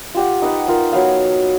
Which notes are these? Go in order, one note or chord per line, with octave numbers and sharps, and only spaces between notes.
F4 G4 F#5
D#4 B4 F#5
D#4 F4 A#4
F#3 B3 F5 F#5